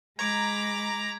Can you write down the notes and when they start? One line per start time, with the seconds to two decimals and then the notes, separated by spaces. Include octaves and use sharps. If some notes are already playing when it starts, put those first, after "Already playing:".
0.19 G#3 A#5 B5 D6 G#6